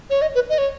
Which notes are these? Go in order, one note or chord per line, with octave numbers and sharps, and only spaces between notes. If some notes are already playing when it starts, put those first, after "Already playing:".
C#5
D#5
B4
D#5
C#5